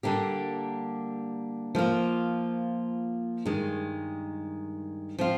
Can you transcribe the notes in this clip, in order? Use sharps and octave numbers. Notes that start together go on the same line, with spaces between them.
D3 G3 A#3 D4 G4
F3 A#3 F4
G2 D#3 G#3
F3 C4 F4